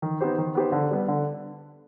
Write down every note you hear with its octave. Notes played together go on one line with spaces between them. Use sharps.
D#3
B3 D#4 G4 C5
D#3
B3 D#4 G4 C5
D3
G3 B3
D3